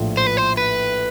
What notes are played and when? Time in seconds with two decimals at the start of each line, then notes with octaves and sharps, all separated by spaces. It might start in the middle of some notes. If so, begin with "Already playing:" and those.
Already playing: A#1 A2 F3
0.17 C5
0.27 B4
0.37 C5
0.57 B4